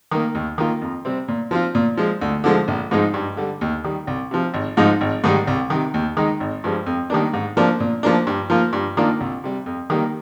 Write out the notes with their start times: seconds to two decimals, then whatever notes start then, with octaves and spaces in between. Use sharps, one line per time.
0.11 D#3 A#3
0.35 D#2
0.58 D#3 A#3 F4
0.81 F2
1.05 C3 G3 C4
1.28 A#2
1.51 F3 C4 F4
1.75 A#2
1.97 F3 G#3
2.22 D2
2.44 D3 F3 G#3
2.68 A#1
2.91 G#2 F3 G#3 D#4
3.14 G2
3.37 D3 G3
3.61 D#2
3.84 D#3 G3
4.07 C2
4.31 C3 F3
4.54 G#1
4.77 G#2 F3 G#3 D#4
5.01 G#1
5.24 G#2 D#3 G3
5.47 C2
5.70 C3 D#3
5.94 D#2
6.17 D#3 G#3 D#4
6.40 G#1
6.64 G2 F3 G#3
6.86 F2
7.10 D#3 G3 A#3 D4
7.33 G#2
7.57 F3 A#3 D4
7.80 A#2
8.03 F3 A#3 D4
8.27 G2
8.50 F3 A#3 F4
8.73 G2
8.97 D#3 A#3 D4 F4
9.20 C2
9.44 C3 G3
9.66 F2
9.90 D#3 G3 A#3